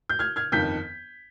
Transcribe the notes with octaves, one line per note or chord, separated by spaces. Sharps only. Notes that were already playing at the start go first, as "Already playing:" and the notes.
G6
F6 G#6
F6 G#6
G1 F2 D#3 G6 B6